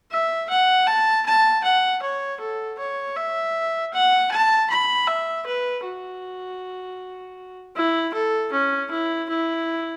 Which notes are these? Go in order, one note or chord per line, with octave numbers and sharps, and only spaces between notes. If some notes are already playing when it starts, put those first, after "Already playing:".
E5
F#5
A5
A5
F#5
C#5
A4
C#5
E5
F#5
A5
B5
E5
B4
F#4
E4
A4
C#4
E4
E4